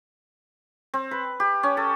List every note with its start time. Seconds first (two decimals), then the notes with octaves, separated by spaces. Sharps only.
0.94 C4
1.11 B4
1.40 G4
1.63 C#4
1.77 A4